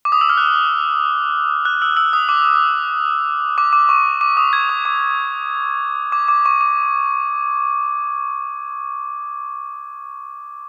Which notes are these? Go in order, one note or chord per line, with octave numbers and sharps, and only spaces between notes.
D6
D#6
E6
F6
F#6
F#6
E6
E6
D#6
D6
D6
D6
C#6
D6
D#6
G#6
D#6
D6
D6
D6
C#6
D6